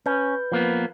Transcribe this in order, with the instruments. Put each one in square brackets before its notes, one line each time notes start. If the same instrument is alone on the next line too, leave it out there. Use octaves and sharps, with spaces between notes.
[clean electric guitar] C#4 [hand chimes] B4 G6
[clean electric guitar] F3 A#3 B3